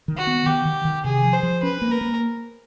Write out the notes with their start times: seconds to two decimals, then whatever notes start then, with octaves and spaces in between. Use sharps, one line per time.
0.08 D#3
0.17 F#4
0.27 B3
0.46 D#3 G4
0.65 D#3
0.85 D#3
1.05 C3 G#4
1.24 F3
1.34 C5
1.43 F3
1.63 C#4 B4
1.82 A#3
1.91 A#4
2.01 A#3